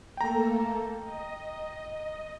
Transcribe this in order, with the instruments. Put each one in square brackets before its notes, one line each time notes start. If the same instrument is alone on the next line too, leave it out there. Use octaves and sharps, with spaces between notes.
[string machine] A3 A#3 A4 [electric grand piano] G5 A#5
[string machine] D#5